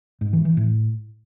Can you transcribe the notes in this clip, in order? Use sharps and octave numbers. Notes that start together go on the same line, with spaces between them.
G#2
E3
E3
A2